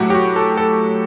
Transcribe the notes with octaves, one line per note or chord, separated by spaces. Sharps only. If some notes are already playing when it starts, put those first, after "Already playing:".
Already playing: A2 F#3 A3 F#4 G4
G4
F#4
A4
A4